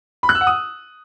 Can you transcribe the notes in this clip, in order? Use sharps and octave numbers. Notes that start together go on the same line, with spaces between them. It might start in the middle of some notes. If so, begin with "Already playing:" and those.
B5
F#6
E6
F#5
D#6